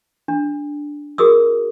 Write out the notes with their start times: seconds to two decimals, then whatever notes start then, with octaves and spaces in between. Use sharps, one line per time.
0.28 D4
1.18 F#4 G#4 A#4 D#6 E6